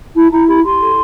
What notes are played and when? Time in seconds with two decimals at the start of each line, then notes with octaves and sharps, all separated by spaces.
0.15 E4 A5
0.31 E4 A#5
0.48 G4 B5
0.64 G4 C6
0.80 A4